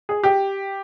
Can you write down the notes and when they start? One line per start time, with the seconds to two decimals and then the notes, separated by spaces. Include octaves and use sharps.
0.09 G#4
0.24 G4